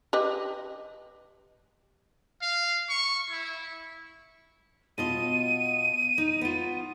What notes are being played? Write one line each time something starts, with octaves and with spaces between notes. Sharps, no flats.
G4 B4 D#5
F5
C#6
E4
B2 F4 D#5 D#7
D#4
B3 F4